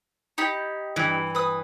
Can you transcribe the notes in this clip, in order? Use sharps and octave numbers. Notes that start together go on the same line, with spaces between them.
D#4 E4 G4
G2 E3
B4 D#6